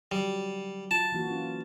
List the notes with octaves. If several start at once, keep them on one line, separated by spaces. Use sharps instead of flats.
D3 F#3 G3
F4 A5
E3 A#3 F#4
C#4 F4